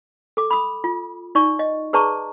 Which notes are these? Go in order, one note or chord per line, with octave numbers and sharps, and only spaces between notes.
A4 D6
B5 D#6
F4
D#4 D5 C#6
D#5
G#4 B4 D5 A5 A#5 C#6